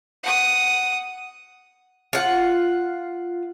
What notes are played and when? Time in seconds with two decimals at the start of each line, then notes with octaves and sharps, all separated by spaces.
0.23 F#5 D#6
2.13 F4 F#5